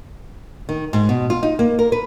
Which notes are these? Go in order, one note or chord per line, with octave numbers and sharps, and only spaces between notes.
D#3
G#2
B2
F4
D#4
A#3
A#4
B4